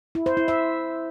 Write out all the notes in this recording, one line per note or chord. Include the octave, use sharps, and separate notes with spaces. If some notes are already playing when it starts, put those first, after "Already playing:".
E4
C5
E4
E5